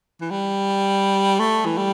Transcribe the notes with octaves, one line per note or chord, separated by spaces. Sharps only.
E3
G3
A3
E3
G3